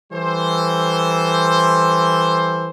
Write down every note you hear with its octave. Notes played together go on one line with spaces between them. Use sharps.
E3 G3 A4 C5